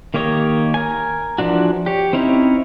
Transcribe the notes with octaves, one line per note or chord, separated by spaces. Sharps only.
D#3 A#3 G4 C#5 D#5
A#4 G#5
E3 F3 D4 F#4
G4 C#5
C4 C#4 D#4 E4 C#5